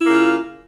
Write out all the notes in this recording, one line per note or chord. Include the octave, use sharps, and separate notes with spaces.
C#3 A#3 E4 F4